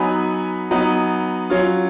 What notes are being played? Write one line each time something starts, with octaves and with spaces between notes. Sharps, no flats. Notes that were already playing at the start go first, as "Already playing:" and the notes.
Already playing: F#3 B3 D#4 G#5 B5
F#3 B3 D#4
F#3 C#4 F4